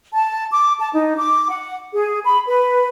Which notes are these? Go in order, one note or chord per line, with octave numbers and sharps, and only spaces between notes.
A5
D6
A5
D#4
D6
F#5
G#4
B5
B4